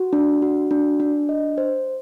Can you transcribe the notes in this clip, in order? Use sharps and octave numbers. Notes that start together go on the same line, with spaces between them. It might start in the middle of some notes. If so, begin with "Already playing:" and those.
Already playing: F#4
D4
F#4
D4
D4
D#5
C5